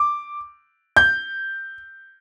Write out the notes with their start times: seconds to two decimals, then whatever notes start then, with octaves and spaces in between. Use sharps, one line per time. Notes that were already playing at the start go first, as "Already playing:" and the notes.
Already playing: D6
0.96 G6